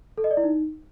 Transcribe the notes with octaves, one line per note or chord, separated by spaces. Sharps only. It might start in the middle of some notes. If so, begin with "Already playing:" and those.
A4
D#5
D5
E4
D#4